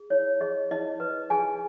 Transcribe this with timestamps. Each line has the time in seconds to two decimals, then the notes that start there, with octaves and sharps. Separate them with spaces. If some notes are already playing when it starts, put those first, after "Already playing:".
Already playing: G#4
0.10 E4 C#5
0.41 G#4 D#5
0.71 E4 D#5
1.00 B4
1.30 G#4 G#5